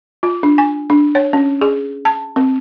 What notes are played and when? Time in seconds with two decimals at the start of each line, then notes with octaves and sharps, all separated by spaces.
0.23 F4
0.43 D4
0.58 G#5
0.90 D4
1.15 C#5
1.33 C#4
1.61 G#4
2.05 A5
2.36 C4